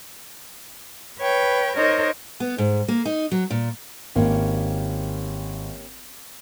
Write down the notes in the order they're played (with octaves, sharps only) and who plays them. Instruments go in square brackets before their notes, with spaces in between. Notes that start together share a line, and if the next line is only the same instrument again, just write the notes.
[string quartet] B4 C#5 G5
D#4 A#4 C5 C#5 D#5
[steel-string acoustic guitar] B3
G#2
A#3
D#4
F#3
A#2
[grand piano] G#1 [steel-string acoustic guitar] A#3 C#4 G4